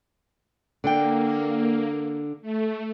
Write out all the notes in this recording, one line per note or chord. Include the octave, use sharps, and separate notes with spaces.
D3 A#3 D4 G5
A3